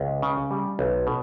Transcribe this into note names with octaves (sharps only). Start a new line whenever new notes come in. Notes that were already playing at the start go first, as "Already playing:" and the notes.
Already playing: C#2
C#3
G3
B1
B2